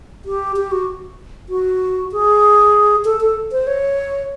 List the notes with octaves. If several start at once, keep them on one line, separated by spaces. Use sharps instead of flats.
G4
G4
F#4
F#4
G#4
A4
A4
C5
C#5